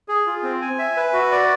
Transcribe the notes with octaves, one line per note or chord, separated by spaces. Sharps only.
G#4
F4
C4
G#5
E5
B4
F#4
D5